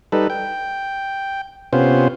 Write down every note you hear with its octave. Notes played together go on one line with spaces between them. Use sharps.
G3 D#4 A4 B4
G5
C3 B3 C#4 F4 C5